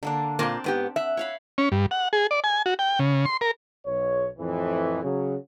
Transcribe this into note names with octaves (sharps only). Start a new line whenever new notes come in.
D3 A#3 D4
A#2 A#3 C4 D5 A5
G#2 B3 G4
E5 F#5
C#5 F5 B5
C#4
G2
F#5
G#4
D5
G#5
F#4
G5
C#3
C6
A#4
B1 C#5
F2 A2 E3
C#3 F#3